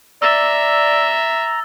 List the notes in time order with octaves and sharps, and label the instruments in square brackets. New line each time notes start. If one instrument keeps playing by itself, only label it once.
[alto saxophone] D5 [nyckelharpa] E5 [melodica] A#5 [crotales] E6 A6